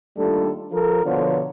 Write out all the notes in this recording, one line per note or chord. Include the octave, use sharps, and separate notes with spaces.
D#2 G3 A3 D4 F4 A4
F3 A4 A#4
B2 D3 F3 B3 F4 C#5